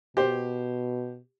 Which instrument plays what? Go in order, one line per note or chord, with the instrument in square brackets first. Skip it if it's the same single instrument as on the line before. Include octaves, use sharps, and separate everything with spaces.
[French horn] B2 [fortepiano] G4 C5